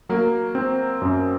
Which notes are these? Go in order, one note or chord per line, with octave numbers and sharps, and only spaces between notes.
F#3 A#3
C4
F#2